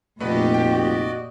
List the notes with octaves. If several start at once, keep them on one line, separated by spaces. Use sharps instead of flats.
F1 A#2 A3 F#4 G4 B4 D5 D#5
G5